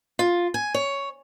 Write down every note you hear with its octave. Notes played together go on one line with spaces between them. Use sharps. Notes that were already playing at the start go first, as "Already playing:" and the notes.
F4
G#5
C#5